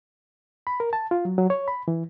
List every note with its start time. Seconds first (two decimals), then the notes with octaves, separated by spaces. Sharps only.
0.67 B5
0.80 A#4
0.93 A5
1.11 F4
1.25 F#3
1.38 F#3
1.50 C#5
1.68 B5
1.88 E3